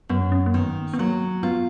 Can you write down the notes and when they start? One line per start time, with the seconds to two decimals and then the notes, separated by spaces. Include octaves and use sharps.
0.09 F#2 B3
0.32 C#4
0.46 A#3
0.54 D#3 B3
0.93 B3
0.99 F#3 A#3
1.43 B3 F4